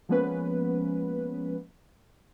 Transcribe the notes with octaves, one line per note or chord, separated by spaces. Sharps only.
F3 G#3 A#3 B3 C#4 B4